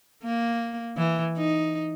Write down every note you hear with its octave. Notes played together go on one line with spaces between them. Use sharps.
A#3
E3
D#4